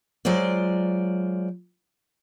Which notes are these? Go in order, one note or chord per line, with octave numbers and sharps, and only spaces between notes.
F#3 G#3 F4 C5 D5